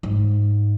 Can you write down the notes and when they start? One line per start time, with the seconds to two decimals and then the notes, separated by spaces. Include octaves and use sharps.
0.03 G#2